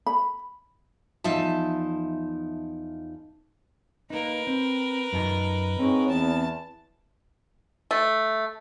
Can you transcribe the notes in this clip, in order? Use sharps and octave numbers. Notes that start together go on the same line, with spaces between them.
B5
E2 F3 D#4 E5 A5
A#3 D#4 A#4 B4
C4
F#2 D#4 A5
G#2 C4 C#5
E2 A5
A3